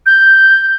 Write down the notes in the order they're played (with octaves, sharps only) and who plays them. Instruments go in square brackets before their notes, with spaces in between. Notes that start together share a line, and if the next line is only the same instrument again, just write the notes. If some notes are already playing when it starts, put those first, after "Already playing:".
[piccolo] G6